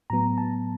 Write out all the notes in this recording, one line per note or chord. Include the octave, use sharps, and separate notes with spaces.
A2 F#3 B3 A#5
A5